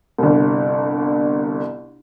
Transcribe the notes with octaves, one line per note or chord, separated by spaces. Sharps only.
G1 C2